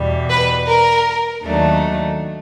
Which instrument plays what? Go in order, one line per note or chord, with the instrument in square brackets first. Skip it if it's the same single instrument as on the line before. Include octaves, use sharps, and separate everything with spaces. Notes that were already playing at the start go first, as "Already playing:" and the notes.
Already playing: [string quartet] E2 B2 G3
[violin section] B4
A#4
[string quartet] D#2 D#3 F#3 A3 D4